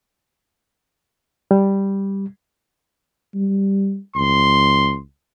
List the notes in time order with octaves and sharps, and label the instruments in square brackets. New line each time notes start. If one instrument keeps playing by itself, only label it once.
[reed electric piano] G3
[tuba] G3
[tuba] C#2 [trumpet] C6